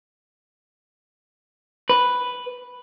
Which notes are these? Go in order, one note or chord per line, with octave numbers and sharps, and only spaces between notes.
B4